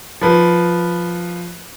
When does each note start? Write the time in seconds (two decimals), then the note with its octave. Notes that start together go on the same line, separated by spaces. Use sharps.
0.21 F3 B4 B5